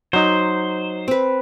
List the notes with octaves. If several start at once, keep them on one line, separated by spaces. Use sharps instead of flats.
F#3 D#4 C5
C4 B4